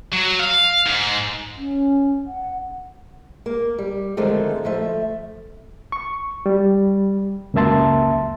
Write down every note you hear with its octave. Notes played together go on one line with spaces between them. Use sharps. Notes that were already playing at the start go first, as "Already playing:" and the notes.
F#3
F5
G#2
C#4
F#5
A#3
G3
D3 D#3 F3 G#3 A3 C4
D2 F3 A3 E5
C#6
G3
C#2 F#2 A#3 E5 A5 C6